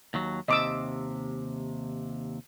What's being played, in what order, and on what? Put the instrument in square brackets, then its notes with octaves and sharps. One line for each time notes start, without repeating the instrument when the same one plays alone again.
[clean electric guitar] D#2 F#3
[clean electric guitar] D#2 C3 [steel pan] D#5 D6 E6